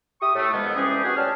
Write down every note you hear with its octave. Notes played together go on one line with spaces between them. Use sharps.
G4 E5 C#6 D#6
A2 A3
F2 D#3 G#3 A#3 B3
C2 E3 C#4 D4 G4 G#4
B3 F#4 G#4
D2 G3 C#5 G5 A5 F6